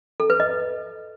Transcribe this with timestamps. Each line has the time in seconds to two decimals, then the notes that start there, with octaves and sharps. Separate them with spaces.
0.20 A4
0.30 B4
0.40 D#5